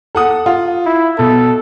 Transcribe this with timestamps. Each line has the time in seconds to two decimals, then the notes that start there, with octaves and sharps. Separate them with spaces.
0.15 A4 F#5 D#6
0.46 F4
0.86 E4
1.19 B2 A4